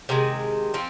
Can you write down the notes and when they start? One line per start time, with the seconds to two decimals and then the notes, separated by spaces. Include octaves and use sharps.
0.09 C3 D#3 G#3
0.74 F3 C4